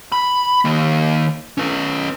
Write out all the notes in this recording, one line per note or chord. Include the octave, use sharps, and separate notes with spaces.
B5
D#3 A#3
C#4 B4